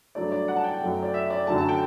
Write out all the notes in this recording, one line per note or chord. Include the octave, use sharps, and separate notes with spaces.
G2 F#3 A3 D5
D5
F#5
A5
G5
F#2 F#3 A3
D5
E5
D5
F#2 D3 F#3 A3 A5
A5
G5